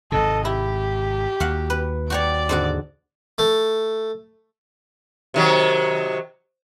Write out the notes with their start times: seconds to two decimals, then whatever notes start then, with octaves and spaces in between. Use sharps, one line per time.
0.12 G#1 G#2 C3 A4 D#5
0.45 E4 G4
1.40 D#2 F#4 F5 F#5
1.70 B4
2.10 F#4 G4 C#5 D5 D6
2.49 G#2 D3 F#4
3.38 A3
5.34 C3 D#3 F#3